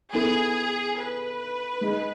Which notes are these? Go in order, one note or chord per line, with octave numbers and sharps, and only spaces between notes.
B3 E4 G#4 A4
B4
G#3 D#4 G#4 D#5